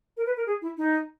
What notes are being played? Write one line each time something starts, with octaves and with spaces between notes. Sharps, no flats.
A#4
B4
A#4
G#4
E4
D#4